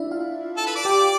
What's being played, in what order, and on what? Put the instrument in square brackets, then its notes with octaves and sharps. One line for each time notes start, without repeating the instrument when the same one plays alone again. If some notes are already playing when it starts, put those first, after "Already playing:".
Already playing: [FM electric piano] D4 E4 D5 E5
F4 F5
[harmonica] A4 A5
B4 B5
D5 D6
[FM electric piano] G4 G5